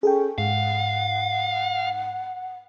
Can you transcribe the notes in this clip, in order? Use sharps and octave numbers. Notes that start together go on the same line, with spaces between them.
C#4 G#4 A4 G5
G#2 F5 F#5